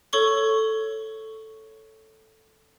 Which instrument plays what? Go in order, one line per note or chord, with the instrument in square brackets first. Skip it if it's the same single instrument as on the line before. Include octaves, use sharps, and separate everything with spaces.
[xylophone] A4 C#5 C#6 G7